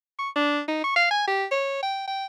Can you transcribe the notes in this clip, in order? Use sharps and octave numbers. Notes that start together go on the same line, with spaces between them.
C#6
D4
D#4
C#6
F5
G#5
G4
C#5
G5
G5